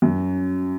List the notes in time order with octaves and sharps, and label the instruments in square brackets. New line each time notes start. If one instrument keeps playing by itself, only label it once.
[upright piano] F#2